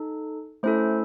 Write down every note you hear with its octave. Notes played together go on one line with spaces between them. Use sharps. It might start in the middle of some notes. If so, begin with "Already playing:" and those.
Already playing: D#4 A4
A3 C#4 E4 A4 C5